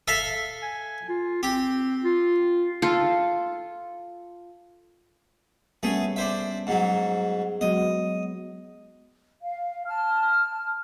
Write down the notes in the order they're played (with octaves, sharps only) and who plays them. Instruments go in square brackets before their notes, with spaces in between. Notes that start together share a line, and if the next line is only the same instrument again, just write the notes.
[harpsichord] A4 E5 F5
[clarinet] G#5
F4
[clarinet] C4 [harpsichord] G4
[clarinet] F4
[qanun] F4 A4
[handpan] G3 B3 C#4 [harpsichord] A3 G#4
[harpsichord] D4 C5 E5
G#2 F#3
[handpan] F#3 G#3 B3 [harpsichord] D#5
[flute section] F5
A5 F6